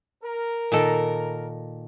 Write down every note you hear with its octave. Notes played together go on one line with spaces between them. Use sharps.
A#4
A#2 D#3 A4